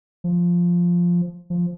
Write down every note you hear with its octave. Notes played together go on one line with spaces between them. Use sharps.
F3
F3